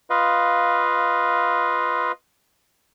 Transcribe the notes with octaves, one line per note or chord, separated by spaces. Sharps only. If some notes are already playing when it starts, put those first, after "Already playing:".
F4 B4 D#5 F5